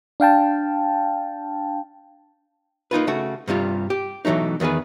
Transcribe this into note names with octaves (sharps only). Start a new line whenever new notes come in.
D4 F5 G5 A5
A#3 D#4 F4 B4
C#3 A3 F#4
G2 C3 G3 F4
G4
B2 E3 F#3 A3 D#4
E2 D#3 B3 G#4 B4